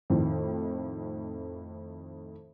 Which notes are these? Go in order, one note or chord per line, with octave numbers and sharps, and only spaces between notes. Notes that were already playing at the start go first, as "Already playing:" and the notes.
F2 A2 D#3